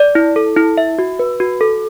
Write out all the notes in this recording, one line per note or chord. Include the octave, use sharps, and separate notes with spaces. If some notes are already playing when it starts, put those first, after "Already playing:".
Already playing: D5
E4
A4
E4
E5
F#4
B4
F#4
A4